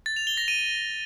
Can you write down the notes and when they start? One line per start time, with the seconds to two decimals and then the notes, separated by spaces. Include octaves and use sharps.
0.06 A6
0.16 F7
0.27 G7
0.37 A#6
0.48 D#7